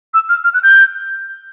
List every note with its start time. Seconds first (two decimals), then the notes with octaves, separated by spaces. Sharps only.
0.14 E6
0.29 F6
0.44 F6
0.54 F#6
0.63 G6